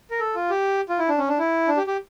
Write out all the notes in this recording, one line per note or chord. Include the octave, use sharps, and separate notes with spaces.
A#4
A4
F4
G4
F4
E4
D4
C#4
D4
E4
D4
G4
G4